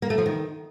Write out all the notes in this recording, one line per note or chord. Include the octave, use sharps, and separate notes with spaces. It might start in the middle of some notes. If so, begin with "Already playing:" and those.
A#3
A3
F3
D#3